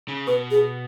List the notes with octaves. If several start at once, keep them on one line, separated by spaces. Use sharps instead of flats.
C#3
B2 B4
G#4